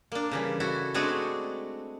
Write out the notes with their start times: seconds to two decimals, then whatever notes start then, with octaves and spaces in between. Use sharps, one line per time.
0.12 A#3 D4
0.31 C#3 E3 G3
0.60 E4 F#4 A4
0.94 G#3 A3 C4 D4 F#4 G#4